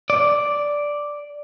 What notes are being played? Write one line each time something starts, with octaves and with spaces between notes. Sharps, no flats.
D5